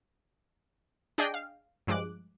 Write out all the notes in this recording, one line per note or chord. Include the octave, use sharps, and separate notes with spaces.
D4 G#4 D5 D#5 G5
F5
G2 F3 G#3 D6 F#6